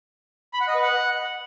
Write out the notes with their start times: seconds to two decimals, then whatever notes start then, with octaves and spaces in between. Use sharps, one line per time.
0.53 B5
0.61 F#5
0.68 D#5
0.75 B4
0.82 F#5